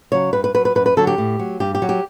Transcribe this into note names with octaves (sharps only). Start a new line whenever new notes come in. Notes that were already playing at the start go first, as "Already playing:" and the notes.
C#3 F#3 C#5
G2 B4
B4
F#3 B4
B4
F#2 B4
B4
D3 F#3 A4
G4
A2
F#3
G2 G4
G4
F#3
G4